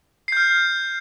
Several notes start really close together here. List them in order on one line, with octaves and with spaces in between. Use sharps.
C7 G6 F6